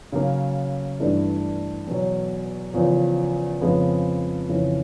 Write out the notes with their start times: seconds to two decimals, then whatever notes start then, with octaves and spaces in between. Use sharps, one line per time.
0.12 C#3 F#3 A#3
1.00 G2 E3 A3 D4
1.87 E2 B2 F#3
2.74 E2 C#3 F3
3.61 F2 C#3 F3 G#3 B3
4.49 F2 C#3 E3